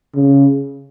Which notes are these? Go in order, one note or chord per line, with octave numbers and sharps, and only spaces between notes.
C#3